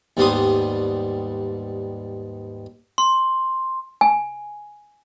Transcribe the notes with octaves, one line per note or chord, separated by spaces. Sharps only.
D#2 G#2 G3 B3 C6 D#6
C6
G#5